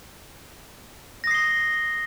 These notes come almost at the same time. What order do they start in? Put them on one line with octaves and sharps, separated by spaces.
A#6 D#6 C7 G7